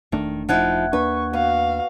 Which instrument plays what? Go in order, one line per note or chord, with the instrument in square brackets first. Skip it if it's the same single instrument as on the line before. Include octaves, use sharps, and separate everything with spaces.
[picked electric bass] E1 A3 D4 [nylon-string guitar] D#3
[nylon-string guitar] F3 D#4 E4 [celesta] F#5 F#6 G#6
[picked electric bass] D#2 A#3 D4 [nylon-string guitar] B4 [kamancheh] C#6
[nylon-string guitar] B3 [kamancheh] F#4 F5